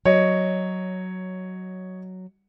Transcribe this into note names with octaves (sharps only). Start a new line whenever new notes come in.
F#3 C#5 D#5